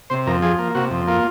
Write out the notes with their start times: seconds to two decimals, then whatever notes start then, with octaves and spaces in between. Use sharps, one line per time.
0.10 C3 C5
0.26 F2 A#4
0.42 F3 G#4
0.59 A#3
0.75 C3 F#4
0.91 F2
1.07 A#3 F4